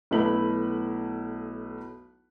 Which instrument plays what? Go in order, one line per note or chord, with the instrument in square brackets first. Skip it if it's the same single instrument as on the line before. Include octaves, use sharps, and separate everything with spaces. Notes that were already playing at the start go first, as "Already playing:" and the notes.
[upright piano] B1 A3 E4 B4 B5 F#7